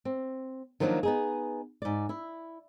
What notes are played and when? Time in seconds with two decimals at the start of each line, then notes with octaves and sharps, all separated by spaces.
0.05 C4
0.80 D#3 F3 F#3 A#3 B3 D4
1.03 B3 D#4 G#4
1.82 G#2 D5
2.09 E4